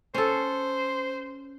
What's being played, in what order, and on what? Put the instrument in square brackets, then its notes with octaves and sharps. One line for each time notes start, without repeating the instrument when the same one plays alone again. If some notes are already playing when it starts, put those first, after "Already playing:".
[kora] C#4 A4 [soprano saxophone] C5